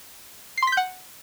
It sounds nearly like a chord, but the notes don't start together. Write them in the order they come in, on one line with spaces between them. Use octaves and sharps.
C7 C6 B6 G6 F#5